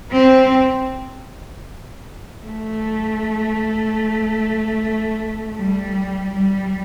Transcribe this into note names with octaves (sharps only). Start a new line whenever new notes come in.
C4
A3
G3
G3